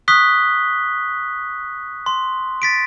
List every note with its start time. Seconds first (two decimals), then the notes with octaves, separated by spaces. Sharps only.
0.08 C#6 D#6 F#6 B6 G7
2.06 C6
2.62 A6 B6 D7